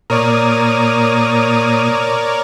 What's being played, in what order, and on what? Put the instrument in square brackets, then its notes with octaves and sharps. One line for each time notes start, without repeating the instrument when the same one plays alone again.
[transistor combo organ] A#2 D#6 [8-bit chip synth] A#4 C#5 D5